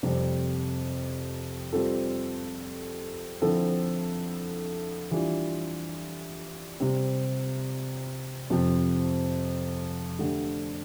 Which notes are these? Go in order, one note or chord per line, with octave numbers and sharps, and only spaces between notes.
F2 C3 G3 C4
G3 C4 F4 A4
D3 F3 C4 E4 A4
E3 G3 D4 F4
C3 G3 C4
F2 C3 F3 C4
D3 A3 D4 G4